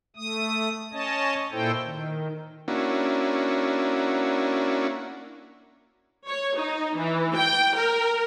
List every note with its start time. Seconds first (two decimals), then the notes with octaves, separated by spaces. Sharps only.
0.16 A3 D#6
0.93 C#4 C#5 D#5 A5
1.52 A#2 E4 A4 C5 G5
1.83 D#3
2.68 A#3 C#4 D4 E4 F#4
6.28 C#5
6.59 D#4
6.98 E3
7.36 G5
7.76 A#4